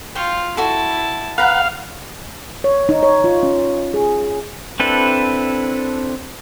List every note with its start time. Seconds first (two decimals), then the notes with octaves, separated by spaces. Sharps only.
0.15 F4 G5 C#6
0.57 E4 F#4 A4 A5
1.38 B4 F5 F#5 A#5
2.64 C#5
2.89 D#4
3.03 C#5
3.24 F4
3.43 C#4
3.94 G#4
4.80 C4 D4 E4 A4 B4